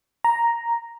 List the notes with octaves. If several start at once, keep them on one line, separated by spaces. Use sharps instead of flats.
A#5